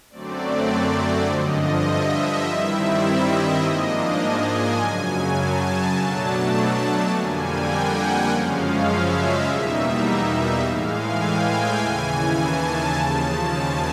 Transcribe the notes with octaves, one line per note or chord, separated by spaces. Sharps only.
F#2 D3 F#3 A3 C4 D5
G2 D3 F3 D#5
E5
G2 D#3 G3 C4 E4
D#5
G#2 F3 A#3 D4 D#5
G#5
F#2 C#3 F#3
A5
B2 F#3 A3 D4
F2 D3 G3 A#3 G#5
G5
F#5
F#2 C#3 F3 G#3 C#4 F5
E5
D#5
E2 B2 G3 A#3 D#4 E5
E5
A2 E3 G#3 F5
G#5
G5
D#2 C#3 E3 G#5
A5
D#2 C#3 F3
G#5